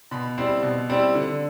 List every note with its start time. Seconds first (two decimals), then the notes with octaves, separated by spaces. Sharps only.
0.11 B2 B5
0.38 G3 C4 E4 C6
0.63 B2
0.89 G3 C4 E4
1.15 D3